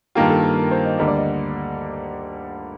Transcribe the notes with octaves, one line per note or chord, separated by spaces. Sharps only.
G2 D#3 A#3 F4 G4
A4
A#4
A#4
C5
D#5
D2 D3 G3 A#3 D#5
D5
D#5